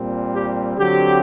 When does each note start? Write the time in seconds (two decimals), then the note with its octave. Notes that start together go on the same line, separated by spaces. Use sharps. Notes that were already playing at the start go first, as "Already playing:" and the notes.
Already playing: A#2 G3 C4
0.34 G4
0.78 D3 F#3 C4 G4